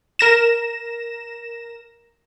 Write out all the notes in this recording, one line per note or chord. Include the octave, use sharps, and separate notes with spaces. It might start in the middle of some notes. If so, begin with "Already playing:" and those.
A#4 A#6 E7